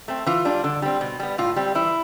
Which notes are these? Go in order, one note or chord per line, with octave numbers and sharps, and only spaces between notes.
A3 C4
E3 F4
G3 D4
D3
G3 C4
B2
G3 B3
A2 F4
G3 C4
E3 E4